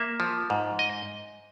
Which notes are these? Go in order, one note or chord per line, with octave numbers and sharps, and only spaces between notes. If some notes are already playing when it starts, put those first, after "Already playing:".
Already playing: A#3 E5
F3
G#2
D#5